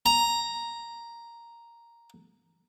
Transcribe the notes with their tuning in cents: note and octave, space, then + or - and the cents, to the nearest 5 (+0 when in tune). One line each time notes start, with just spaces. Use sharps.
A#5 +0